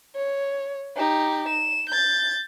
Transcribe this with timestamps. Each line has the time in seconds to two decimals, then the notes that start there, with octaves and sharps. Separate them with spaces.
0.15 C#5
0.96 D#4 G4
1.48 E7
1.89 G6 A6